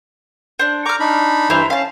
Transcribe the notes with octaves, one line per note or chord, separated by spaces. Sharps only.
D4 C5
A#5 C#6 D6 F6
D4 D#4 B5
G2 E3 E4 C5 A#5
C#4 F5 A5